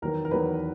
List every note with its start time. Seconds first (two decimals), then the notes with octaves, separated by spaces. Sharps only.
0.02 E2 D#3 F#3 A#4
0.25 A#4
0.31 E2 D#3 F#3 B4